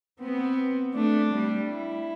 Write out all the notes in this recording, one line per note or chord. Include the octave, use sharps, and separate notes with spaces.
B3 C4
A3 D4
G3
E4